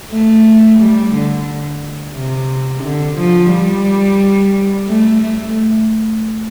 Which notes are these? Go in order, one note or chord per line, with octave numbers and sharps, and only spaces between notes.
A3
G3
D3
C3
D3
F3
G3
A3
A3